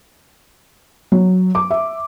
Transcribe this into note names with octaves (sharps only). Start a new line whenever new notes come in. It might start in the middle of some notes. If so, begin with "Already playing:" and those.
F#3
D6
E5